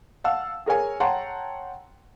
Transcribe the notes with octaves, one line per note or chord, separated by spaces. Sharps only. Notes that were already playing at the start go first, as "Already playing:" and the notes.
F5 F#5 A5 E6
G#4 A#4 C#5 G#5
C#5 F#5 G5 A5 A#5 C6